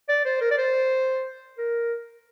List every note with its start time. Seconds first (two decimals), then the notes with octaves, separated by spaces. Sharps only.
0.09 D5
0.25 C5
0.41 A#4
0.51 D5
0.58 C5
1.58 A#4